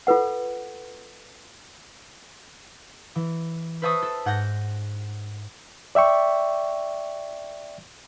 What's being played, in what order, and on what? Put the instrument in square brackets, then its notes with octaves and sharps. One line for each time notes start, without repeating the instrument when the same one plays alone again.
[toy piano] F4 A4 B4 F#5
[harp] E3
B4 C5 E5 A5 C#6 D#6
A4
G#2 F#5 G6 A#6
[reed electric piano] D5 E5 G5 C#6